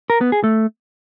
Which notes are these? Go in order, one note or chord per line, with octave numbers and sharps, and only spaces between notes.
A#4
B3
G#4
A3